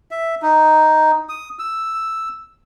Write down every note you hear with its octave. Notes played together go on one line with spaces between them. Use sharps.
E5
D#4
D#6
E6